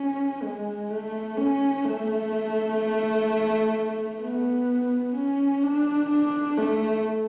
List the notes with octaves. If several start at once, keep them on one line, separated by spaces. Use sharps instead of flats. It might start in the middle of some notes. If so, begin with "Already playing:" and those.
Already playing: C#4
G#3
A3
C#4
A3
B3
C#4
D4
D4
A3